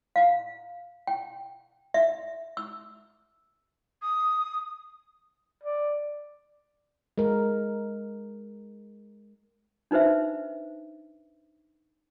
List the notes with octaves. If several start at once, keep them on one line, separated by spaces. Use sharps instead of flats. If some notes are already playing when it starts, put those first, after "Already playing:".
F5
G5
E5
E6
D#6
D5
G#3 A#4
D4 D#4 B4 C5 E5